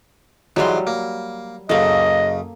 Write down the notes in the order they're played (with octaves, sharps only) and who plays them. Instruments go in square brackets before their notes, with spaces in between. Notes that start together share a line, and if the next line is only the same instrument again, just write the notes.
[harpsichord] G#2 E3 C6 [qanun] F#3 G3
[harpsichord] A#3
[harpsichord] F#2 C#3 [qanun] A#3 A4 [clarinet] D#5